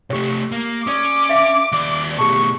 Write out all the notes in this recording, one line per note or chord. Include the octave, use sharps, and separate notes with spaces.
C3 A3 G4 C#5
A#3
C#4 D5 D6 D#6
E5 F5
D#2 D5
B2 A3 G4 G#4 A5 C#6